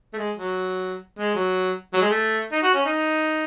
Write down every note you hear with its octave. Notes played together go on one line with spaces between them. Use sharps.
A3
G#3
F#3
G#3
F#3
F#3
G#3
A3
D#4
F#4
C#4
D#4